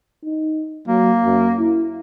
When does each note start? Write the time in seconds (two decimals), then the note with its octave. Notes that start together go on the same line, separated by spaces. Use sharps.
0.25 D#4
0.88 F#3 A#3
1.25 F#2
1.58 E4